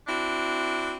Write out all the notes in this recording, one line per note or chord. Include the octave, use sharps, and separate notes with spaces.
C4 D4 E4 F#4